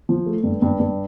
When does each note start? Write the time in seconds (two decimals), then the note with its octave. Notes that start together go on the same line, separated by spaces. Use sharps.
0.09 F3
0.26 A3
0.43 G2
0.62 G2
0.80 G2